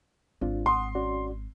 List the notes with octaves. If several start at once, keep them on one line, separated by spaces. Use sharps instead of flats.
G#1 C4 D4 F4
F#5 C6 D#6
C#4 F#4 D5